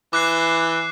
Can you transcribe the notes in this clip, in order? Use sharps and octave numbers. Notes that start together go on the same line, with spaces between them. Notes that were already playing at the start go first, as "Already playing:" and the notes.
E3 D6 F#6 C7